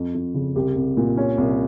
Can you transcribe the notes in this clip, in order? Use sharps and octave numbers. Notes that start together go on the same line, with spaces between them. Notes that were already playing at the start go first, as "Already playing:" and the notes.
Already playing: F2
F2
C#3
C2 G4
C2
A#2
C#4
C2